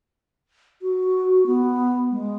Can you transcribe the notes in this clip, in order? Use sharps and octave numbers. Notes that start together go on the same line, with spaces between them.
F#4
B3
G#3